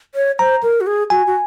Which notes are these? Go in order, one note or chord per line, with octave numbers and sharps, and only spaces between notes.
C#5
C5 A#5
A#4
F#4
G#4
F#4 G#5
F#4